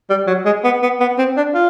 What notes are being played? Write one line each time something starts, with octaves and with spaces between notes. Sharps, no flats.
G3
F#3
G#3
B3
B3
B3
C4
D4
F4